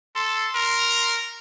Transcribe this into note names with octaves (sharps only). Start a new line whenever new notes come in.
A4 C6
A#4